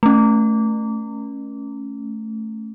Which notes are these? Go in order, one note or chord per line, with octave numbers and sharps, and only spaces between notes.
A3 C#4